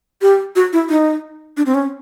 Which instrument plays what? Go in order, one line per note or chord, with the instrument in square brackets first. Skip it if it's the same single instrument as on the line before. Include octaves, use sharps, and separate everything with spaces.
[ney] G4
F#4
E4
D#4
D4
C4
C#4